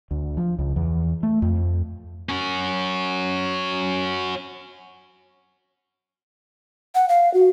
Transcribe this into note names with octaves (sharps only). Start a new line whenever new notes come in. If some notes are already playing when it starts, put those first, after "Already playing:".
D2
F3
C#2
E2
A3
F2
C#4 F#4
F#5
F5
F#4